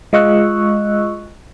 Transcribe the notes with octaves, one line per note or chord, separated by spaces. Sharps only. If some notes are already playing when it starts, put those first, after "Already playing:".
G#3 F4 D#5 C#6 E6 F#6